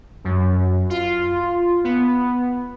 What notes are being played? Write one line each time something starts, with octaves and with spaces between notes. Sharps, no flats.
F#2
F4
B3